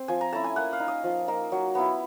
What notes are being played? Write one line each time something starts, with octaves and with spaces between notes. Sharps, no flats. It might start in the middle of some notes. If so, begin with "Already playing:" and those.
Already playing: C4
F3 G#5
A#5
A3 C#4 E4 A5
G#5
A#3 F#5
F5
D#4
D#5
F3
A#3 D#4
F#3
B3 E4